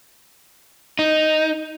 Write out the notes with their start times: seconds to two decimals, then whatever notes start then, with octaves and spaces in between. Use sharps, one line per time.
0.99 D#4